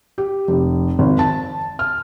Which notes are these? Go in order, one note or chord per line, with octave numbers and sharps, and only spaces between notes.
G4
F1
G#1
A5
F6